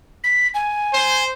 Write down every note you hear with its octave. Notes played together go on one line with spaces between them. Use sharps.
B6
G#5
C5